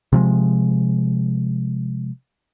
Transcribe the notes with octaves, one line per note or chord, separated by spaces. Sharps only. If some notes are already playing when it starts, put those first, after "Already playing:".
C3 F3 G#3